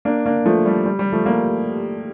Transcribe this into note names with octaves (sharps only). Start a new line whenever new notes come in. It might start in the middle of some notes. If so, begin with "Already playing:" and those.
A#3 D4
A#3 D4
F3 A3
G3
G3
G3
F3 A3
G3 A#3